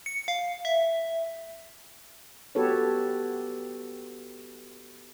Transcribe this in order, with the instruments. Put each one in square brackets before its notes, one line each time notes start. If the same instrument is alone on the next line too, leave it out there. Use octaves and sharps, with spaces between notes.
[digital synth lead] C#7
F5
E5
[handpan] B3 F#4 G4 A4 B4 C#5